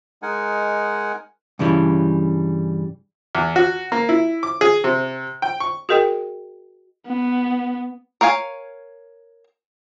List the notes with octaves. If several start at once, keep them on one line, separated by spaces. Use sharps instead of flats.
G#3 D#4 A#4 F#5 G#5
G2 C#3 E3 G3
E2
F#4
A#3
E4
D6
G#4
C3
G5
C#6
F#4 G#4 A#4 D#5 G5
B3
A#4 C#5 F5 G#5